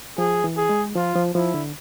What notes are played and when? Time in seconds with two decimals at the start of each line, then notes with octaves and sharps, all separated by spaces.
0.18 F3 G#4
0.44 E3
0.57 G#4
0.69 G#3
0.95 F3 F4
1.16 F3
1.35 F3 E4
1.54 D3